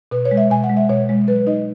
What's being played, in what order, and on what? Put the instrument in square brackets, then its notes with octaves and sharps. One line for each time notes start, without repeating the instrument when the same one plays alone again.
[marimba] B2 B4
C#5
G#3
E5
B2 G#5
F#5
G#3
E5
B2 C#5
G#3
F#3 B4
D#4 D#5